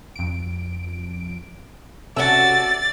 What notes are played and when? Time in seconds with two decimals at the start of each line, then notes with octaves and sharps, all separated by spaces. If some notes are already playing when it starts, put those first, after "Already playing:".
0.16 F2 D7
2.17 C3 C#4 F#4 A4 D5 E5 A6